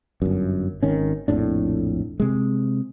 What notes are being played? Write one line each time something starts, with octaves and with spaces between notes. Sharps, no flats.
G1 F#2
G#1 D#3 C#4
A#1 F2 A2 D4
C3 G#3